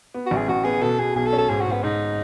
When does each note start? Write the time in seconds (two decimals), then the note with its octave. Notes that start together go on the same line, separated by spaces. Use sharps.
0.14 B3
0.26 F#4
0.31 A1
0.37 G#4
0.48 A1 F#4
0.64 B3 G#4
0.81 B2 A4
0.99 B2 G#4
1.15 B1 G#4
1.27 A4
1.32 C#4
1.38 A4
1.49 G#2 G#4
1.61 F#4
1.66 G#2
1.72 B3
1.83 G#2 D#4